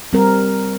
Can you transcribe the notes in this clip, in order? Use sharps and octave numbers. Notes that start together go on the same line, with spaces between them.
G3 C4 A#4